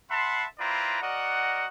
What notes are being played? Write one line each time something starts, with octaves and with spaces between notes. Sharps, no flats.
E5 F#5 A5 B5 C6
C4 E4 F4 B4 D5 A#5
F#4 A#4 D5 D#5 F#5